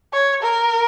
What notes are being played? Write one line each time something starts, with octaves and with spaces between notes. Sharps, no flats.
C#5
A#4